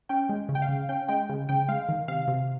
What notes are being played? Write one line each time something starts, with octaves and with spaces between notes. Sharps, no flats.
C#4 G5
G#3
C#3
G5
F5
C#3
C#4 G5
G#3 G5
C#3
C#3 G5
G#3 F5
D#3
C3 F5
C3